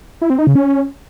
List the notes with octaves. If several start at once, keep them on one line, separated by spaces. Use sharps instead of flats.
E4
C4
D#4
C#3
C#4